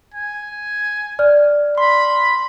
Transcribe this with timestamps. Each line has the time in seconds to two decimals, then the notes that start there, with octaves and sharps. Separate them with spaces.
0.14 G#5
1.19 D5 F6
1.78 B5 C6